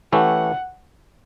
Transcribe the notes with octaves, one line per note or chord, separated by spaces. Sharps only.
E3 A3 C#4 E4 G4 F#5